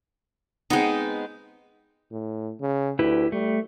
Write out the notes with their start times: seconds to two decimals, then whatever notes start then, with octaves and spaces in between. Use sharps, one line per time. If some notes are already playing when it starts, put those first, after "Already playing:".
0.70 G#3 B3 C4 D#4
2.12 A2
2.61 C#3
2.99 D2 E4 G4 B4
3.32 G3 A3